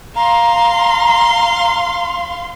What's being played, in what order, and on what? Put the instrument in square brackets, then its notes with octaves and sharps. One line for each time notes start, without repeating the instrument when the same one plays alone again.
[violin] F5 C6 [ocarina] A#5